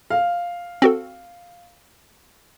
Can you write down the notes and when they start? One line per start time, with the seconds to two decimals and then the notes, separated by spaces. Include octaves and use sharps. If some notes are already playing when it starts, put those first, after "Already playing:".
0.10 F5
0.82 C4 F#4 A4